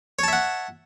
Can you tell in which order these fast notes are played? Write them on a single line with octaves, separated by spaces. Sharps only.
C#5 A5 E5 F#5